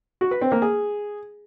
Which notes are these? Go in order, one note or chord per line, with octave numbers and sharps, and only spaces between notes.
F#4
B4
C4
A#3
G#4